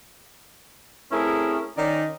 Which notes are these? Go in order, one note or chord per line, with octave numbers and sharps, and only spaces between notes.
A3 C4 C#4 E4 G#4 A#4
D#3 C#4 D#4 D5